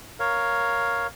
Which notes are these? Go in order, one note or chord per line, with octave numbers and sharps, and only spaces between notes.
A#4 C#5 F5